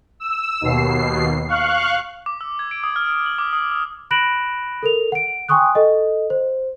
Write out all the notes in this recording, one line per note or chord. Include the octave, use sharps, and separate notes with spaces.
E6
D#2 B2 C7
F5 C#6 F#6
D6
E6
G#6
D7
D#6
F6
F6
F#7
D6
D#6
E6
B5 F#6 A#6 D7 E7 F#7
A4 A#4 F7
F#5 D7
G5 G#5 C6 C#6 D#6 F#6
A4 D#5
C5